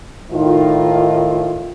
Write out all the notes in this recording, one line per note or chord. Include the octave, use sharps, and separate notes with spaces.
A2 D#3 D#4 F4